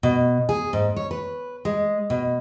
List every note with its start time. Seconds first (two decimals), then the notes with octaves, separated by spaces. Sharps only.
0.03 B2
0.49 G#4
0.73 G#2
0.96 C#5
1.11 B4
1.65 G#3
2.10 B2